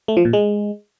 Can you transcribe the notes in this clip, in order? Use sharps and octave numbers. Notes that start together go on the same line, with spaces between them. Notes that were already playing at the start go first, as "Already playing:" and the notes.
A3
F3
A#2
G#3